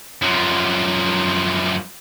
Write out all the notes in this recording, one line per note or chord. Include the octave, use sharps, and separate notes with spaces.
F#2 F3